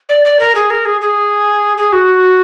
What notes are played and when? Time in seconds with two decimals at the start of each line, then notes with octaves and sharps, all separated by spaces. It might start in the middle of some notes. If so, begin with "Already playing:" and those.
0.09 D5
0.25 D5
0.39 A#4
0.55 G#4
0.70 A#4
0.85 G#4
1.01 G#4
1.78 G#4
1.93 F#4